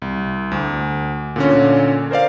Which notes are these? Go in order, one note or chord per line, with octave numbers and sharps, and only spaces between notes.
C2
D2
A#2 D3 C#4
A#4 C5 D5 F5